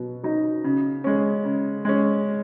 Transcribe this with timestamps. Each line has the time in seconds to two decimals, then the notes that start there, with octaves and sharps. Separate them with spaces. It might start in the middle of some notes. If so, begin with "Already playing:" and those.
Already playing: B2 F#3
0.23 F#3 D#4
0.64 C#3
1.04 G#3 C#4
1.45 C#3
1.85 G#3 C#4